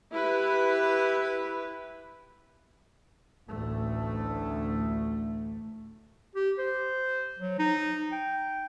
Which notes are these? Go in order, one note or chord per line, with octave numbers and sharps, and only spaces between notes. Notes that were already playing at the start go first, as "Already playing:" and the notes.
E4 G4 B4
A1 D2 A2 A3
G4
C5
F#3
D#4
G5